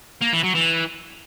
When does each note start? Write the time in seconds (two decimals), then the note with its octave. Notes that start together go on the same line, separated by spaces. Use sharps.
0.22 A#3
0.33 E3
0.44 F#3
0.55 E3